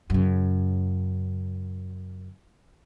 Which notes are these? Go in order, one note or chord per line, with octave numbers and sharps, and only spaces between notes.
F#2 C#3